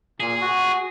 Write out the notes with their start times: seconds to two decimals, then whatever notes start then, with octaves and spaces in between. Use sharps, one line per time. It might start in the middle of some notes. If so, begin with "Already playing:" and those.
0.20 A#2 G#4
0.41 F#4